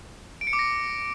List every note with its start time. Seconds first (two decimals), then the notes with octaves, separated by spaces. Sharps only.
0.41 D7
0.47 C#7
0.53 D6
0.59 A#6